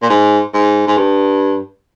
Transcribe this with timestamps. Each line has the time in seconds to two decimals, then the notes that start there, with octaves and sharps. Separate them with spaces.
0.03 A#2
0.09 G#2
0.54 G#2
0.87 G#2
0.97 G2